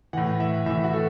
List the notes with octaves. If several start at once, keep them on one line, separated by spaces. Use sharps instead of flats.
A2 E3 F#5
E5
A2 E3 E5
F#4
A4